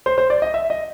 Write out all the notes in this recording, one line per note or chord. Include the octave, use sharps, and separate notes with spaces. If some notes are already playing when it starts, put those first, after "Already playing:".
C5
C5
D5
D#5
E5
D#5